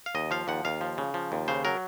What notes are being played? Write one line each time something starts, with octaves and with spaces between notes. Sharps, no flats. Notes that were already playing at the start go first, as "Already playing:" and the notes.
F5
D#2 D#5
F3 F5
D#2 F#5
D#2 F5
F3
C#3
F3
D#2
C#3 C5
F#3 A#4